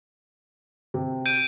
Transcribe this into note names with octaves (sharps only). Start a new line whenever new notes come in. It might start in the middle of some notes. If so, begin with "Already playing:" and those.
C3
G6 D7 D#7